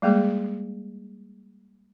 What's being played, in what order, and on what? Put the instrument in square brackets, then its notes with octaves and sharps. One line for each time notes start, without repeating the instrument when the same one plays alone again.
[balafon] G3 G#3 A#3 G#4